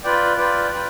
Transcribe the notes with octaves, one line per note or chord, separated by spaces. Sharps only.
F4 B4 D5 G5
F4 B4 D5 G5
F4 B4 D5 G5